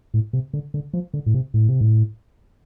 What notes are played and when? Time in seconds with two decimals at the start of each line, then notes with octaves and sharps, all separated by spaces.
0.14 A2
0.33 C3
0.53 D3
0.74 D3
0.93 F3
1.14 D3
1.26 A2
1.34 C3
1.54 A2
1.68 C3
1.81 A2